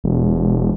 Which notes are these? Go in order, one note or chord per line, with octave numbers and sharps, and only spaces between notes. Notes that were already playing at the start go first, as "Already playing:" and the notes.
E1